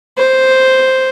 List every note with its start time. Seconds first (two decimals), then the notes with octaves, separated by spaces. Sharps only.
0.18 C5